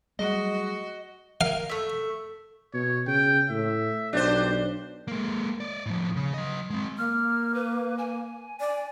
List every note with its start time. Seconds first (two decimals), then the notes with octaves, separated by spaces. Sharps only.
0.19 F#3 G3 A3 F#4 G#4 D#5
1.41 A#4 F5
1.69 A3 E5
2.73 B2 C#5
3.07 C#3 G5
3.50 A2 E5
4.13 B1 D4 G4 C5
5.08 G#3 A#3
5.60 C#5 D5
5.86 A2 F3
6.16 C#3
6.34 F#3 D#5
6.70 G#3 C4
6.98 A#3 F6
7.54 B4
7.98 G#5
8.60 D5